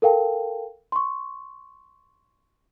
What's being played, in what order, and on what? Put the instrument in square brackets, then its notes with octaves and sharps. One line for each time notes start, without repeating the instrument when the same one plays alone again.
[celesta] A4 A#4 F5 G5 A5
C6 C#6